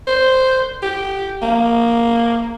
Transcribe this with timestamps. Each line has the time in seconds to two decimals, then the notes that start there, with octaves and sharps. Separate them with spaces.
0.07 C5
0.82 G4
1.42 A#3